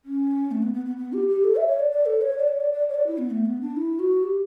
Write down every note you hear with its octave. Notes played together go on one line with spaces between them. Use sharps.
C#4
A3
B3
B3
B3
B3
G4
G4
A4
E5
C#5
D5
D5
A4
C#5
D5
C#5
D5
D5
C#5
D5
E4
B3
A3
B3
D4
E4
F#4
G4